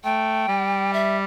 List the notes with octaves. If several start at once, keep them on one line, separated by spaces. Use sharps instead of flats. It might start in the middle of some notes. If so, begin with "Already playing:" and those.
A3 G5
G3
E5